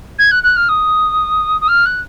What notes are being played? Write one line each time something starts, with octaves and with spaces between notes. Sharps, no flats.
G#6
F#6
F#6
F6
D#6
D#6
F6
F#6